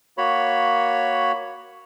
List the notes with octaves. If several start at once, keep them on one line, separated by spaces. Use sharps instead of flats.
A#3 F#4 C#5 B5